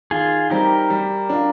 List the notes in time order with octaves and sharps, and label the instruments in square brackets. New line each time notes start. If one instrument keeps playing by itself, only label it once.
[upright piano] D#3 [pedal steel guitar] F4 G#4
[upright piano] G3 C4 D#4 [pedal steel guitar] G4 A#4
[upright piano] G3
D4 F4